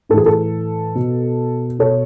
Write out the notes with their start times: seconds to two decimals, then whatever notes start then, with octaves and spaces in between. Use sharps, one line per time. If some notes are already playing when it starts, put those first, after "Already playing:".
0.09 A2 A4
0.14 E3 G#4
0.26 A4
0.95 B2
1.79 B2 A4 C#5